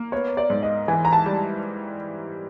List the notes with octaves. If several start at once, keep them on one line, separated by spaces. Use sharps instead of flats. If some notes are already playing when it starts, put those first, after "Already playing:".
Already playing: A#3
B3 C#5
D5
G#2
D#5
E3 G#5
A#5
A5
G3